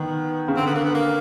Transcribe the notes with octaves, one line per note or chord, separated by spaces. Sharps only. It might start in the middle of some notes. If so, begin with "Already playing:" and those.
Already playing: D#3 B3
C#3
D3 C4
B3
A#3
B3
A#3